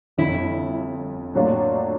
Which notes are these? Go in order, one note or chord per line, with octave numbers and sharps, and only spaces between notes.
G1 F2 D3 E4
A2 F#3 A#3 D4 F4